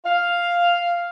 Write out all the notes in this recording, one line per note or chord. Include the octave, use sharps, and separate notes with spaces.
F5